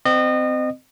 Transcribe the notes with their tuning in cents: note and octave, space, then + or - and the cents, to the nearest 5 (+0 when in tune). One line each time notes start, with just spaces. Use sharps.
C4 -25 D#5 -30